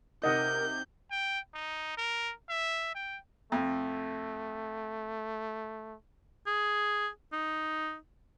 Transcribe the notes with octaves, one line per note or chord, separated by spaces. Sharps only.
C3 D#4 A#4 D#5 F#5 G6
G5
D#4
A#4
E5
G5
F2 A3
G#4
D#4